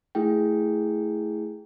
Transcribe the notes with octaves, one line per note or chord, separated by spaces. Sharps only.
A3 E4 G#4 G5